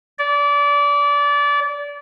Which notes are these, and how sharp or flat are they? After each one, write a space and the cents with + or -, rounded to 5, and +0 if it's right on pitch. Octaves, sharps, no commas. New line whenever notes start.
D5 -25